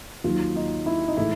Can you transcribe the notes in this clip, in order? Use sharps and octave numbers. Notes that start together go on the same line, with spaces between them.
D#2 D#3 F#3 F4
D#4
E4
D#4
A2 E3 G#3 E4